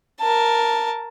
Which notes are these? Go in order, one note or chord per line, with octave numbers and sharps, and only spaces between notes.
A#4 A5